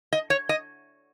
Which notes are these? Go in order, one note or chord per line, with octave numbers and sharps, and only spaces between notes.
D#5
C#5
D#5